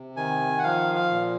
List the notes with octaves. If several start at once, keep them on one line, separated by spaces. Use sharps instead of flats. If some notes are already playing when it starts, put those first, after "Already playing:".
Already playing: C3
D#3 G#5
F#5
F3 F5
F5
A#2